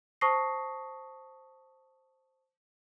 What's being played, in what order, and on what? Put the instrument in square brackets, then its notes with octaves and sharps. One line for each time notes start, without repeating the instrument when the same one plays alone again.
[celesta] C5 A5 C#6 D#6 A#6 C7